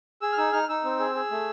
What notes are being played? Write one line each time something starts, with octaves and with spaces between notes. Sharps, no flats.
G#4 E6
F6
D#4 E6
D#4 F6
D#4 E6
C4
G#4
G#4
A3